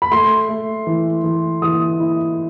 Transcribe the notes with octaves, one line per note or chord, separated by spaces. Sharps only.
B5
A3 C6
A3
E3
E3
E3 D#6
E4